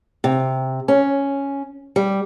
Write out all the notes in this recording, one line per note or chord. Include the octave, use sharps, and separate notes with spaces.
C3
C#4
G3